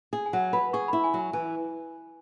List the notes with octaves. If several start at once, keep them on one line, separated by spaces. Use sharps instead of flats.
G#4
G#5
F#3 F#5
B4 B5
G#4 C#6
E4 B5
G#5
F#3
G#5
E3 G#5